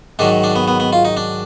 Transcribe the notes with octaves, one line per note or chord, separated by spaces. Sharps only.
G#2 D#3 F#3 D4
D4
B3
B3
B3
F4
D#4
D4